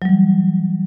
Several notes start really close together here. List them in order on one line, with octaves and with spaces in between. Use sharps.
F#3 G3 E3